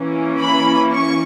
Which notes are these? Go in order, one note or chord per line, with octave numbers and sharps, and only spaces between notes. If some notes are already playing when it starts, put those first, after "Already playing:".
Already playing: E3 A#3 C#4
B5
C#6